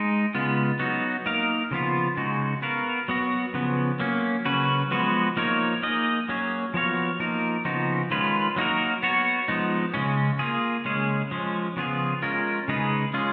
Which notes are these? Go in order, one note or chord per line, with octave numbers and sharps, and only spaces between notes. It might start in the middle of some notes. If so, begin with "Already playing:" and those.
Already playing: G#3 D#4
C#3 G#3 B3 F4
F#3 B3 D#4 F#4
A#3 D#4 A#4 F5
C#3 F3 B3 F4
C#3 G#3 D#4 F#4
B3 F#4 A#4 F5
F#3 B3 F#4
C#3 F3 B3
F#3 A#3 C#4
C#3 F#3 C#4 F#4 B4
F3 G#3 B3 F#4 B4
F3 A#3 D#4 A#4 C#5
A#3 D#4 G#4 D#5
F#3 A#3 C#4 G#4 C#5
F3 B3 F#4 C#5 F5
F3 A#3 D#4 A#4
C#3 F3 B3 D#4 F#4
D#3 G#3 C#4 F4 B4
F#3 A#3 D#4 F#4 A#4
B3 F#4 C#5
F3 G#3 B3 D#4
C#3 G#3 C#4
A#3 F4 G#4
C#3 G#3 C#4 G#4
F3 G#3 C#4
C#3 F3 B3 F4 G#4
G#3 C#4 F4 A#4
C#3 G#3 D#4 G#4 B4
G#3 C#4 F4 G#4